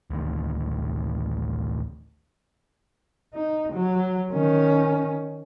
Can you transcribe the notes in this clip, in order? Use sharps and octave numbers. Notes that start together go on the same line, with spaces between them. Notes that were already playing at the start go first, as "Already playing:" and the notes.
D1 A1 D2 D#3
D#4
F#3
D#3 C#4